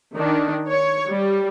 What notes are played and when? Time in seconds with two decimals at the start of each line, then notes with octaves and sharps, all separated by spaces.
0.16 D#3 D4
0.69 C#5
1.08 G3